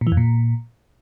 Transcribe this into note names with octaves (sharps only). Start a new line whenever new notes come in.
A#2
E3
F2
A#2